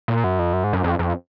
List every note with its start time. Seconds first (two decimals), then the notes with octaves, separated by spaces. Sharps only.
0.08 A#2
0.24 F#2
0.39 F2
0.53 F#2
0.64 G#2
0.73 F#2
0.84 F2
0.99 F2